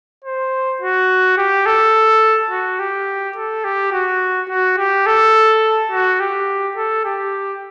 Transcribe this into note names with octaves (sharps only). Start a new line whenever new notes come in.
C5
F#4
G4
A4
F#4
G4
A4
G4
F#4
F#4
G4
A4
F#4
G4
A4
G4